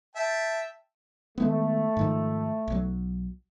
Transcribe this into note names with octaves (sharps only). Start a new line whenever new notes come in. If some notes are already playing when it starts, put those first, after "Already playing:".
E5 G5 A5
D#3 G#3 A3 B3
G#2 D#3 F3
B1 F#3